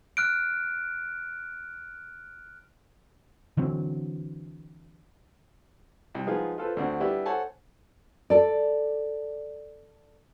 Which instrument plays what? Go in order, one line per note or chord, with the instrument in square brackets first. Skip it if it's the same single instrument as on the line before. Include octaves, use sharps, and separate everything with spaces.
[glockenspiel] F6 F#6 D7
[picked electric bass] D3 E3 F#3 C4
[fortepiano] C2
F3 G#3 B3 D#4 F4 G#4
F4 A4 B4 C5
D2 D3 C4 F#5
G3 B3 D4 E4 G4
A4 C5 C#5 F#5 G#5 A5
[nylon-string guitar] A4 D5